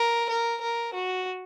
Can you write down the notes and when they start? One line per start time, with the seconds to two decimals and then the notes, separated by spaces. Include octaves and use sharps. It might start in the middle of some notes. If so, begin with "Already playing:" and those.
Already playing: A#4
0.30 A#4
0.61 A#4
0.94 F#4